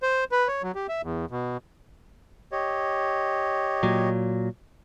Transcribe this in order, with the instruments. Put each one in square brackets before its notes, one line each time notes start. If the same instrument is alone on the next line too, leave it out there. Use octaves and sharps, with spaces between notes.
[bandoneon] C5
B4
C#5
F#3
G4
E5
E2
B2
[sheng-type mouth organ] G4 C#5 D#5
[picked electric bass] A#2 F#3